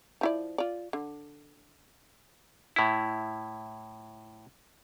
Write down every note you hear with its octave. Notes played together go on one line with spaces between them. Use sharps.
F3 E4 D5
F4 D5
D3
A2 E4